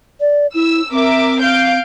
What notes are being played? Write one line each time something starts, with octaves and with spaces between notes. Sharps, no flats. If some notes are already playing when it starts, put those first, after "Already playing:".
D5
E4 E6
C4 A#4 E5 D6
F5 G6 D7